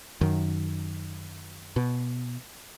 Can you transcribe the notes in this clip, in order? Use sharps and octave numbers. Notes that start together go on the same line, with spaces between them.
F#2 D#3
B2